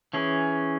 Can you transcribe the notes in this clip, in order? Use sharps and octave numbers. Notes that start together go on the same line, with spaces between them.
E3 C#4 G#4